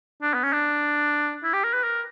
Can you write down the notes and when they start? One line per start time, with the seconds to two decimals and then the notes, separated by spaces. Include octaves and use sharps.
0.22 D4
0.34 B3
0.44 C#4
0.53 D4
1.44 E4
1.53 G4
1.64 A#4
1.73 B4
1.84 A#4